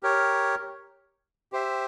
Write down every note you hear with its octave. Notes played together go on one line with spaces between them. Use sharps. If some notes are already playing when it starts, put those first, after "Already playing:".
G4 A#4 C#5
G4 C5 E5